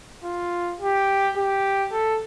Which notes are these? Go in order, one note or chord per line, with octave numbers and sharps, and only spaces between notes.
F4
G4
G4
A4